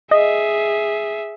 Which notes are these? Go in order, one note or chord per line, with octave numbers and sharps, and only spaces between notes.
G#4 D#5 E5